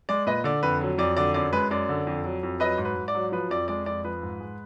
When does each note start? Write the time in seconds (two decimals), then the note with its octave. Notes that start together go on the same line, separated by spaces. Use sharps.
0.09 G#3 D5
0.26 A#2 B4 D#5
0.44 D3 D5
0.63 F2 B4
0.81 F#3
0.98 F2 D5
1.17 D3 D5
1.34 F#2 D5
1.53 G#3 B4
1.71 F#2 D5
1.89 D3
2.07 F2
2.24 F#3
2.43 F2
2.60 F#3 B4 D#5
2.78 G#2
2.85 B4
2.96 G#2
3.08 D5
3.15 F#3
3.32 F3 B4
3.50 F2 D5
3.68 G#3 D5
3.86 F2 D5
4.04 F3 B4
4.23 G#2
4.40 G#3